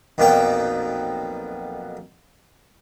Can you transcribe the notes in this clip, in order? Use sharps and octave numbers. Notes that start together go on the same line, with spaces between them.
B1 F2 A#2 A#3 B3 G5